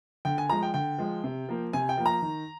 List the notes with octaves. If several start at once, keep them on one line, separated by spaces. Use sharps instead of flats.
D3 G5
G#5
F3 G#3 A#5
G5
D3 G5
F3 G#3
C3
F3 A#3
C3 G#5
G5
F3 A#3
A#5
D#3